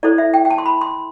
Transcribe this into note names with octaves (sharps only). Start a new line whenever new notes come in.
E4 A4 C5 D5
E5
G5
G5
A5
C6
B5
C6